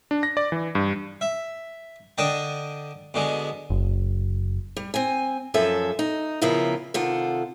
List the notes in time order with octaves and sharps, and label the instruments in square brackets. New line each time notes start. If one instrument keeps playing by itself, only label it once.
[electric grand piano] D4
A#6
D5
E3
G2
[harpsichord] E5
D3 D4 D#5 G5 A5
B2 D3 G#3
[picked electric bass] F#1
[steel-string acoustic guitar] G3
C4 G#5
F#2 F3 C#4 A4 E5
D#4
C#3 F3 B3 E4 F4 A#4
C3 D#3 F4 A4 F#5